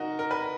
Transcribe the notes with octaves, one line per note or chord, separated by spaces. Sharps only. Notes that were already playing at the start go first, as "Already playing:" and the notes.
Already playing: D#4 F#4 A#4
A#4
B4